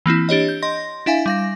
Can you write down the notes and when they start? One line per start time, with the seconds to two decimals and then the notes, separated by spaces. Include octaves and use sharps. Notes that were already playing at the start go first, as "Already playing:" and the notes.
0.06 E3 A#3 C4 E4
0.29 D4 G4 C#5 D#5
0.48 G6
0.62 D#5 C6 A#6
1.06 D4 E4 E5 F5 G#5
1.26 G3 F5 A#6